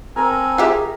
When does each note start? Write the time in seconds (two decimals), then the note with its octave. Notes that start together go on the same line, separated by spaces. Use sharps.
0.16 C4 A4 A#4 G#5
0.58 F4 G4 G#4 E5